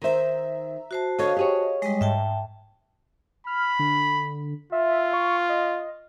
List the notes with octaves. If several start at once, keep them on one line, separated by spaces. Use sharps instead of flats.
D#3 C5 E5 A#5
F#4 C5 A5
D3 A4 C#5 D#5 F5
G4 G#4 C#5
G3 G#3 D#5
G#2 E5 G5 A5
B5 F6
D3
F4 E5
C#6
D#5